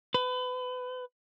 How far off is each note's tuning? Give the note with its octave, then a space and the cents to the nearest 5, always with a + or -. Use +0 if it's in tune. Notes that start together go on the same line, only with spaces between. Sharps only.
B4 +30